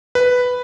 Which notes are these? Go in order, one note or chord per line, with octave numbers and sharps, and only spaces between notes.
B4